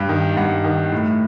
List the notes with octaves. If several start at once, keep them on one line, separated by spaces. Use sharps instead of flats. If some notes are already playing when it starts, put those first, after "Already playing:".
Already playing: G2
D#3
G2 F#5
D#3
A2